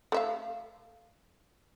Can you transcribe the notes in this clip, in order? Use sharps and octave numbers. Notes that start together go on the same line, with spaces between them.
A3 E5 F5